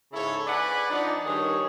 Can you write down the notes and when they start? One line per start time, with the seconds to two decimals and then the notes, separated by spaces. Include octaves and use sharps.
0.12 G#2 C#3 E4 A4 C#5
0.46 B4 D5 F#5 G#5 B5
0.90 F3 D4 D#4
1.25 G2 D#3 G#4 C#5